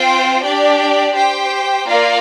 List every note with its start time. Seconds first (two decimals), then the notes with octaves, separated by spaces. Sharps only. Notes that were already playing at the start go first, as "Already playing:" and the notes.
Already playing: C4 F4 C5 G5
0.43 D4 G4 D5
1.15 G4 C5 G5
1.88 A#3 F4 A#4 D5 F5